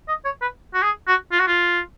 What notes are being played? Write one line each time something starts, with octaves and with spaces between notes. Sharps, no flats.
D#5
C#5
B4
F#4
G#4
F#4
F4
F#4
F4